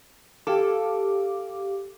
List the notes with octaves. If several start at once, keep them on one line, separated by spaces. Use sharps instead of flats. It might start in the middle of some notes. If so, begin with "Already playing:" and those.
G4 A4 F5 D6